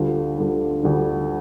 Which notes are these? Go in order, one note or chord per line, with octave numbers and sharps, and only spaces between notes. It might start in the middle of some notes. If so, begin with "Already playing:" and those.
Already playing: D2 D3 G3 D4 F4
D2 D3 G3 D4 F4
D2 D3 G3 D4 F4